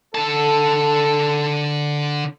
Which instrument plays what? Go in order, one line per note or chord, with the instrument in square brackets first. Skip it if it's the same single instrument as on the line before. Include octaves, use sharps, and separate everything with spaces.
[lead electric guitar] D3 A5 [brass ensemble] A4